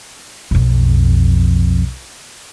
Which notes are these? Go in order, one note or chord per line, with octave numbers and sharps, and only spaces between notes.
B1 F2